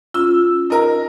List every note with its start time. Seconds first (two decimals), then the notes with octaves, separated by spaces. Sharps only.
0.14 C#4 F4 E6
0.70 D#4 A#4